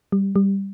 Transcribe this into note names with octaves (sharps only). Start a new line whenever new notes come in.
G3
G3